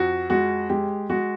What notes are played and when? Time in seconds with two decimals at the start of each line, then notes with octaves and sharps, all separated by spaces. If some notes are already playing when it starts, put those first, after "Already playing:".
Already playing: F2 F#4
0.30 G#3 F#4
0.69 G#3 G4
1.10 G#3 F#4